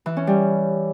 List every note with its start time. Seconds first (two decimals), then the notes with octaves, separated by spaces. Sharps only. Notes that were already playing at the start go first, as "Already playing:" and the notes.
0.06 E3
0.17 C#4
0.27 G3